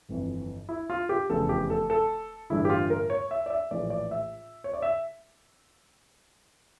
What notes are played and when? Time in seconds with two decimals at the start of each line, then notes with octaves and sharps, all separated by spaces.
0.09 G1 F2 E3
0.69 E4
0.90 F4
1.09 G4
1.30 F1 E2 C#3 A4
1.49 G4
1.70 A4
1.90 A4
2.50 A1 G2 D3 E4
2.65 G4
2.70 F4
2.90 A#4
3.10 C#5
3.31 E5
3.46 D5
3.50 E5
3.71 A#1 A2 E3 D5
3.90 D5
4.11 E5
4.64 C#5
4.74 D5
4.82 E5